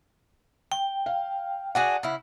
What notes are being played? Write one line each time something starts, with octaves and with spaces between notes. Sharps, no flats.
G5
F5
D4 F#4 G#4 F#5
C#3 E4